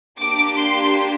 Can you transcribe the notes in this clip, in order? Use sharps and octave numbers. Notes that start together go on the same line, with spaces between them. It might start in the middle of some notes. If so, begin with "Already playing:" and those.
A#3 D4 G4 D6
C6